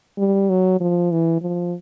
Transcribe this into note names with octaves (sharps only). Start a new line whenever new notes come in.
G3
F#3
F3
E3
F3